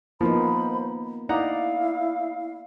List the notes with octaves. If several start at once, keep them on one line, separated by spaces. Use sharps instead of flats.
F3 A#3 B3 D#4 C5 B5
D#4 E4 D5 F5 F#5 A#5